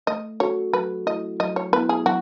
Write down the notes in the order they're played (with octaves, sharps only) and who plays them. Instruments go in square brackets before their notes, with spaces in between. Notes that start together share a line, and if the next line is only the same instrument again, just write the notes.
[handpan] A3 [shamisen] D#5
[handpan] C#4 F#4 A4 [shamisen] C#5
[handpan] F#3 [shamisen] B4
[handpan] A3 E4 [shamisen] D#5
[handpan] F#3 [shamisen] D#5
[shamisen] C#5
[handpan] B3 E4 [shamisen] B4
[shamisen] G#4
[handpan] F#3 [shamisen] F#4